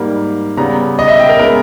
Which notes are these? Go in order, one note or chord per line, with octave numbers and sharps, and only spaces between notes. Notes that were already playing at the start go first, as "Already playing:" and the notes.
Already playing: G#2 G3 A#3
C#3 G3 B3 A#5
D#5
E5
G5
A#4
C#3 G#3 B3 A#4